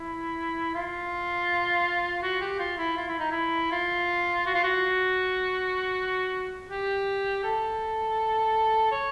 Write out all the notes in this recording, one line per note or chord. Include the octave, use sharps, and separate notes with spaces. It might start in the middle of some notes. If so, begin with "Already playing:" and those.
Already playing: E4
F4
F#4
G4
F4
E4
F4
E4
D#4
E4
F4
F#4
F4
F#4
G4
A4
C#5